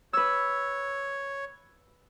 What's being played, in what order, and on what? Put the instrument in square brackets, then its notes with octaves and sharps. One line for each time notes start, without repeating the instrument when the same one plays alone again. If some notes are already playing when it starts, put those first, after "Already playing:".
[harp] B4 E6 [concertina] C#5